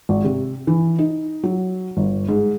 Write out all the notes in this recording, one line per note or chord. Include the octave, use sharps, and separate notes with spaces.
G#1
C3
E3
D#4
F#3
G1
G#2